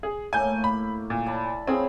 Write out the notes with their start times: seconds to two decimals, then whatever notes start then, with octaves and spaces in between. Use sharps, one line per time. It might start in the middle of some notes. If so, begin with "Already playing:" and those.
0.03 G#4
0.33 A2 A3 A#3 G#5 G6
0.64 B5
1.10 A#2
1.26 D5 A5 B5
1.67 C4 E4 F4 G#4 C#5